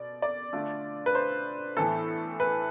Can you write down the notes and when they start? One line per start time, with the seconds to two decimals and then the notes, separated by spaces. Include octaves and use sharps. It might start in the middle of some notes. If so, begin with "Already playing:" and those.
Already playing: B2 D5
0.22 D5
0.53 D3 A3 D4 F4
1.06 B4
1.15 C5
1.77 A2 E3 B3 A4
2.40 B4